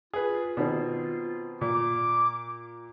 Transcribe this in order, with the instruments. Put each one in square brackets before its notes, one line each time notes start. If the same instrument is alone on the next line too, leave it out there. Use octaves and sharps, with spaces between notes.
[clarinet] F4 [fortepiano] G#4 B4
[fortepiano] B2 D#3 C4
[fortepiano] A#2 [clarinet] D6